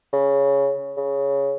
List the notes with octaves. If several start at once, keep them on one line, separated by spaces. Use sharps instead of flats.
C#3
C#3